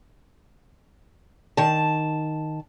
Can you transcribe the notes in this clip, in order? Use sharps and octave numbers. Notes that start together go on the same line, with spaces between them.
D#3 A5